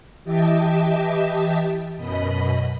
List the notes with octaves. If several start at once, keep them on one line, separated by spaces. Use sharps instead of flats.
E3 G4 D#5 E5 G5 A5
F#2 B2 D#5 B5